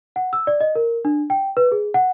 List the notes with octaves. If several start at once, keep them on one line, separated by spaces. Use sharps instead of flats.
F#5
E6
D5
D#5
A#4
D4
G5
B4
G#4
F#5